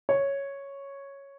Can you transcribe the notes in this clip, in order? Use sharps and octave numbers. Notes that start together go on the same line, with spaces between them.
C#5